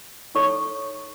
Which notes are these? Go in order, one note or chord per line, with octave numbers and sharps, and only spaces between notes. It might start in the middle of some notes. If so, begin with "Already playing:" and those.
D#4 A4 C#5 C#6